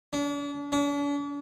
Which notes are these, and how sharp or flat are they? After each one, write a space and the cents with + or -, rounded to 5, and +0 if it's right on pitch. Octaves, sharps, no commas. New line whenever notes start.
D4 -40
D4 -45